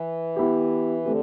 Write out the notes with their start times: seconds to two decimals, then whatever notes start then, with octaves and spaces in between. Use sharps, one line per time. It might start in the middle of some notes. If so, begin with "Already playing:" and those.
Already playing: E3
0.36 B3 E4 G4
1.05 D3 A3 C4 G4